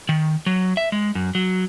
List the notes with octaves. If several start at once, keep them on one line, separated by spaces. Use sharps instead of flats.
D#3
F#3
E5
G#3
F#2
F#3